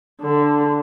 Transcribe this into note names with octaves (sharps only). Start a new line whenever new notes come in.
D3